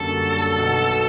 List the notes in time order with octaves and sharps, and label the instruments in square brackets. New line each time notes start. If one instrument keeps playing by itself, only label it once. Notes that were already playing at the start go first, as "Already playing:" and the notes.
Already playing: [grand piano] F#2 D3 G3 A#3 C#4 [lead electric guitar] A4
[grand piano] B1 B2 F#3